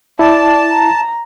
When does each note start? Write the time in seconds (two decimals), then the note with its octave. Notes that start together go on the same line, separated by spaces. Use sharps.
0.19 E4 D5 A5
0.70 A#5